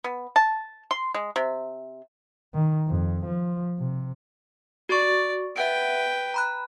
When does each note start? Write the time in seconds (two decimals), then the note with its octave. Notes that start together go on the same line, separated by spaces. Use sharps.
0.04 B3
0.36 A5
0.91 C6
1.14 G#3
1.36 C3
2.54 D#3
2.88 F2
3.26 F3
3.79 C3
4.89 F#4 D5 C#6
5.56 B4 E5 F#5 G5 D7
6.34 A#5 B5 F#6